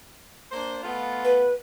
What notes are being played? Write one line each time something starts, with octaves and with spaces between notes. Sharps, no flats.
A#3 D4 C5
A3 B3 F4
B4